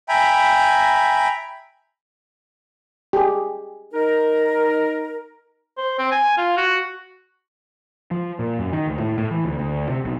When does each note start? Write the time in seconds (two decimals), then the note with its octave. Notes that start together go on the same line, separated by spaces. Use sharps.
0.09 E5 G5 G#5 A#5 B5
3.13 G4 G#4
3.94 D#4 A#4
5.77 C5
5.99 C4
6.11 G#5
6.37 F4
6.57 F#4
8.11 F3
8.39 A#2
8.59 F#2
8.73 D#3
8.87 D2
9.00 A2
9.18 A2
9.31 E3
9.45 D2
9.59 D2
9.89 C3
10.05 B1